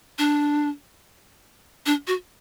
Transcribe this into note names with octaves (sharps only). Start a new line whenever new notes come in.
D4
D4
F#4